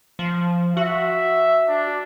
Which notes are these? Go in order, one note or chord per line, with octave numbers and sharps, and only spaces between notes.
F3
F#4 E5
D4